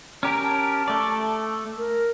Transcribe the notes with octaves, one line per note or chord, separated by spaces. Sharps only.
C#4 G4 A#4 A#5
A5
A3 D5
A#4